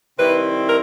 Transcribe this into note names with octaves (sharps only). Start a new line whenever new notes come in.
C3 D#3 G3 C4 E4 B4
A#4